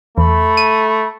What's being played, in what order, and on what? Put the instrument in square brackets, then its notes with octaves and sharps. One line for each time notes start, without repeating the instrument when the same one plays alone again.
[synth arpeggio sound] E2 [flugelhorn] A3 [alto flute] B5
[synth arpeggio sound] D#7